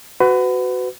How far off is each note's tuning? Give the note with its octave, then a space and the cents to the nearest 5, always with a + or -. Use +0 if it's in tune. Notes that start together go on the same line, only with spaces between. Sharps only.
F#4 +5 B4 +30